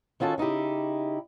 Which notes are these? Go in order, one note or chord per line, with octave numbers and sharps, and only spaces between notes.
D#3 C#4 F4 F#4 A4
C#3 D#4 E4 G4